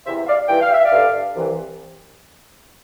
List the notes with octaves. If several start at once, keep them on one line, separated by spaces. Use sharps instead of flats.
E2 C3 E3 C5 E5
D5 F5
G2 E3 G5
F5
E5
D5 F5
G2 D3
C2 C3 E3